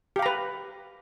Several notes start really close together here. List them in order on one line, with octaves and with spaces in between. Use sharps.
G4 F5 A#5 B4